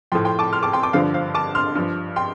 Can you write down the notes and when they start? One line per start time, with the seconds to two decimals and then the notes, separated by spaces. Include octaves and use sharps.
0.12 A2 F3 G5 C6
0.25 G5 C6
0.39 A5 D6
0.53 C6 F6
0.63 A5 D6
0.73 G5 C6
0.83 A5 D6
0.93 G2 D3 F3 C5 F5
1.14 C5 F5
1.35 A5 D6
1.55 C6 F6
1.75 G2 F3
2.16 G5 C6